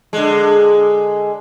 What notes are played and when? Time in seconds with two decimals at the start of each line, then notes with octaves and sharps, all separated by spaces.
0.13 D3 G#3